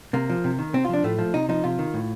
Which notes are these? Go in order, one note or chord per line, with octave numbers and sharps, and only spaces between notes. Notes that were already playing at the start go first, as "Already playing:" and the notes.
C3 A#3
F3
C3
D#3
C3 C4
F4
F3 D4
A2 A3
F3
C3 D#4
F3 D#4
C3 F4
D#3
A2